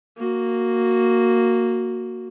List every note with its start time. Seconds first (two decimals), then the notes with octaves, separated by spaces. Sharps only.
0.17 A#3 F#4